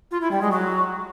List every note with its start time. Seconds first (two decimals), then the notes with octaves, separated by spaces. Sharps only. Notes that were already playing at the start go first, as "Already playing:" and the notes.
0.11 F4
0.21 E4
0.31 G3
0.41 G#3
0.52 F#3